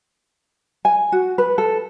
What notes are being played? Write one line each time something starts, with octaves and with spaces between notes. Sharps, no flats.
G#5
F#4
B4
A4